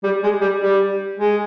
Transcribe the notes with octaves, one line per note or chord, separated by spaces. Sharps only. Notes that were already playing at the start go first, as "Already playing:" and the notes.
G3
G#3
G3
G3
G#3